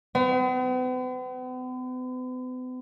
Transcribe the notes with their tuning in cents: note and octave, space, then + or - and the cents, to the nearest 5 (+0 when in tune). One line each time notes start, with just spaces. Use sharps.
B3 +45